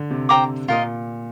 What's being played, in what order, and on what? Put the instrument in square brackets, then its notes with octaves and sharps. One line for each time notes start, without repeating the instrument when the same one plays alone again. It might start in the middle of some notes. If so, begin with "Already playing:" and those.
Already playing: [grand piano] D3
C3
[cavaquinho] C5 G5 A#5 D6
[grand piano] A#2 [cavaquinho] F4 A#4 D#5